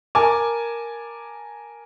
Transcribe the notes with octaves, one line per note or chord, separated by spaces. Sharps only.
A#4 G#5 A5 D6